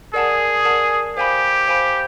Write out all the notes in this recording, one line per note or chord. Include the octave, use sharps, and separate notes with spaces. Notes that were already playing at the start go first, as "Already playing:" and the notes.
G#4 A#4 D5 F#5 A5
A#4 D5 F#5 A5
G4 C5 F5 G#5 B5
C5 F5 G#5 B5